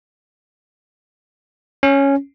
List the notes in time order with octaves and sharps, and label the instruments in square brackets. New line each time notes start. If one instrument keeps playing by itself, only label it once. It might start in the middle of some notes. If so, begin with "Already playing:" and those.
[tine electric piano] C#4